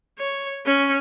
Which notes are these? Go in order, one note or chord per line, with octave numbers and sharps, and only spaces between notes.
C#5
C#4